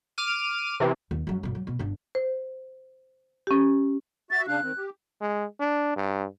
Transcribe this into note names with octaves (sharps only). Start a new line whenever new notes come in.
D6 F6 D#7
C3 E3
D#2
F#2 F#3
G1 B2
F#3
B2
G1 D4
C5
C#4 G4
F#4 E5 A6
C#3 D4 F5 F#6
D#3 C4
G4
G#3
D4
G2